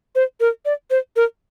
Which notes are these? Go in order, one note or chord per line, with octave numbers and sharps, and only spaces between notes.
C5
A#4
D5
C5
A#4